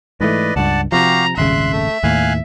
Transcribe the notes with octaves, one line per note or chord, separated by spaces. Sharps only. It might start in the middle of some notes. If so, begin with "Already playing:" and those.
G#2 E3 A3 B4 D5 D#5
C#2 G2 D5 F#5 A5
C3 F3 F#4 G4 F5 A#5
D#1 G#1 C#3 E5 C6 F#6
A3
D#2 A2 F5 G#5 F#6